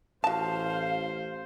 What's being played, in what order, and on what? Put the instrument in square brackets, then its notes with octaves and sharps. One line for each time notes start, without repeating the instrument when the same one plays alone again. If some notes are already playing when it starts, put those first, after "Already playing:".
[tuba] A1 [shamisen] F#4 A5 [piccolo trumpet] C5 [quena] F5